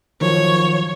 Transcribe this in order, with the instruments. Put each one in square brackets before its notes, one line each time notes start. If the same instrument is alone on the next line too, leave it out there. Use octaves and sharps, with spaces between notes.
[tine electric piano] D#3 F3 F#3 [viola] C#5